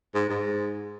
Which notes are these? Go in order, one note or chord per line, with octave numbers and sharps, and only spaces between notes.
G#2
G#2